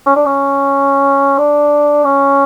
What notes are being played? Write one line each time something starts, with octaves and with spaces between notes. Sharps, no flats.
C#4
D4
C#4
D4
C#4